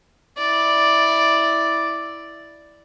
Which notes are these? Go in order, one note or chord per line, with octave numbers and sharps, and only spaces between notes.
E4 D5